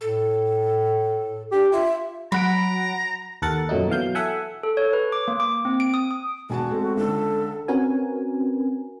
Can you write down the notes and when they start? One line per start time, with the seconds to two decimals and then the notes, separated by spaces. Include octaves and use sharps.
0.01 A2 A4
1.52 D4 G4
1.72 F4 E5
2.32 F#3 F#5 A#5 B5 D7
3.42 D#2 A4 A#4 F#5 A6
3.69 F#2 A#2 F#3 A3 D#4
3.88 B2 E3 F#3 F5 G6
4.15 A4 E5 F#5 G#5
4.63 A4
4.77 C#5
4.93 B4
5.12 D6
5.28 A#3
5.40 D6
5.65 C4
5.80 D7
5.94 D#6
6.11 D#6
6.50 E1 F#4 G#5 A5
6.71 G#3 A3 C4
6.97 C#2 D3 A4
7.68 C4 C#4 F#4 A#4 B4 G#5